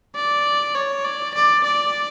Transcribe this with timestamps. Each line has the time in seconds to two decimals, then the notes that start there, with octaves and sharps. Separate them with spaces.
0.16 D5
0.75 C#5
1.04 D5
1.34 D5
1.63 D5